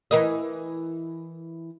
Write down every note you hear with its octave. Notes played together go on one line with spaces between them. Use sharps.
E3 A#4 D#5